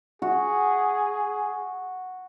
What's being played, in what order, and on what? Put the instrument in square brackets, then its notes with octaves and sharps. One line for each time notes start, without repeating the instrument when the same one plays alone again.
[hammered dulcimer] F#4 [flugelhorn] G#4